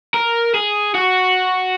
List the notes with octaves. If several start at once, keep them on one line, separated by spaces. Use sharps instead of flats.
A#4
G#4
F#4